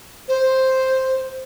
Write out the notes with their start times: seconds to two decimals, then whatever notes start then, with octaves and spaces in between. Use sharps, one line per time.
0.28 C5